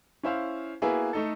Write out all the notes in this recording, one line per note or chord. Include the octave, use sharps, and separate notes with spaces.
C#4 E4 C5 F5
A#3 B3 E4 F#4 G#4 B4
A3 D#4 A4